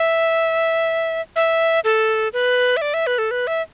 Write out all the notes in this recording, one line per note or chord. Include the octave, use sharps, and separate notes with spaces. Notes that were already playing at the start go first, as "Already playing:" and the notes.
Already playing: E5
E5
A4
B4
E5
D5
E5
B4
A4
B4
E5